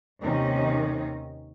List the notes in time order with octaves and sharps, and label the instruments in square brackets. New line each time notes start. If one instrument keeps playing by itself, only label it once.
[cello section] D#2 C3 D#3 C#4 D#4